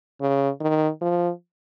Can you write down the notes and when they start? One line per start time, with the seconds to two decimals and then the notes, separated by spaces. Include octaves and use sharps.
0.21 C#3
0.61 D#3
1.01 F3